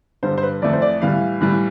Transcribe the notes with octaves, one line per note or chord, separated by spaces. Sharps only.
G2 D3 G3 C5
C5
B4
F2 E3 A3 D5
C5
D5
A2 E3 G3 F5
A2 E3 G3